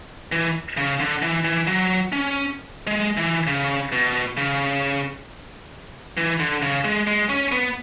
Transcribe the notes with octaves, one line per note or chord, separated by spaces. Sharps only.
E3
C#3
D3
E3
E3
F#3
C#4
G#3
E3
C#3
B2
C#3
E3
D3
C#3
G#3
G#3
C#4
B3